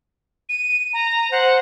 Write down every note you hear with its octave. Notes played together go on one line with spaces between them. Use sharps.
D#7
A#5
C5 F#5